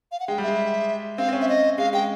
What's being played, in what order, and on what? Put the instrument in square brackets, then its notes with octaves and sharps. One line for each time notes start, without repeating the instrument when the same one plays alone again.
[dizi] F5
F#5
[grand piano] G#3 [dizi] G5
[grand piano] G3
[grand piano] G#3 [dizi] E5
[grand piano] C4 [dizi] F5
[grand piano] C4
C#4
[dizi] E5
D#5
[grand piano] G#3 [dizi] F5
[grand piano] G#3 [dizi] G5